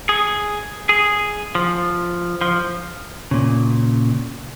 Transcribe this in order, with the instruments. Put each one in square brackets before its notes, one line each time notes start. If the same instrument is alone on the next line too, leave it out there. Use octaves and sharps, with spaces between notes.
[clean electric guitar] G#4
G#4
F3
F3
[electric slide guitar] A#2 C#3